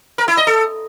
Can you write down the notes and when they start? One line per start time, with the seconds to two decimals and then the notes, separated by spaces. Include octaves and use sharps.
0.18 A#4
0.28 E4
0.37 D#5
0.47 A4